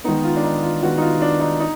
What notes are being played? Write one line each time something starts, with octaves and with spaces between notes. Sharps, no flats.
D#3 G#3 B3 D#4
F4
D4
D#4
F4
D#3 G#3 B3 F#4
D#4
F4
D4
D#4
D#4